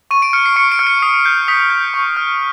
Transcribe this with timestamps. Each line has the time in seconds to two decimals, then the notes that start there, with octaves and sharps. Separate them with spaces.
0.11 C#6 D#7
0.22 D7
0.33 F6 C#7
0.46 C7
0.56 C#6 C#7
0.72 D7
0.79 F6
0.87 C#7
1.02 D#6 C7
1.25 G6 C7
1.48 D#6 B6
1.70 G6
1.94 C#6
2.16 F6